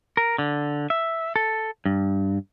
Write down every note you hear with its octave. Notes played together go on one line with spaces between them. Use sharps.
A#4
D3
E5
A4
G2